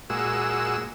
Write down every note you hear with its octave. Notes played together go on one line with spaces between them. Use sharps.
A#2 G#3 F#4 E6